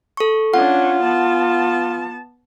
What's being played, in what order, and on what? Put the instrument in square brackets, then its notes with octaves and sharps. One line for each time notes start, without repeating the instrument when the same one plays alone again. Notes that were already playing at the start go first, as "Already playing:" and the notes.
[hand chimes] A4 C#6
[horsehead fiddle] C#4 D4 [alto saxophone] F4 [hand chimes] F#5
[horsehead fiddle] B3 A5